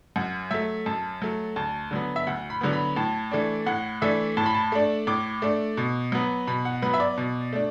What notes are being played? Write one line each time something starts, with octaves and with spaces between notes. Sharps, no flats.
F#2 F#5
F#3 A3 E5
F#2 A5
F#3 A3
D2 A5
D3 F#3 B3
E5
D2 F#5
B5
D3 F#3 B3
B5
A2 A5
E3 A3 D4
A2 F#5
E3 A3 D4 E5
A2 A5
B5
A5
A3 D4
A2 D6
A3 D4
B2
F#3 B3
B2 B5
F#5
F#3 B3 B4
E5
D5
B2
A3 D4